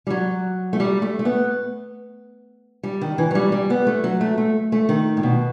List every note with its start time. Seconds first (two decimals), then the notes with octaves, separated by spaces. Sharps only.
0.07 G3
0.10 F#3
0.73 A3
0.80 G3
1.02 A3
1.19 A3
1.25 B3
2.83 G3
3.01 D#3
3.18 E3
3.31 F#3
3.35 G3
3.52 G3
3.70 B3
3.87 A3
4.04 F#3
4.21 A3
4.38 A3
4.72 A3
4.89 D#3
5.17 A2
5.23 B2